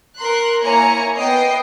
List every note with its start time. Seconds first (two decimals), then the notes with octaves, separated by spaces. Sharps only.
0.17 A#4 C6 F#6
0.63 A#3 E4 C#5 G#5 A#5 C#7
1.17 B3 D#5 G5 C7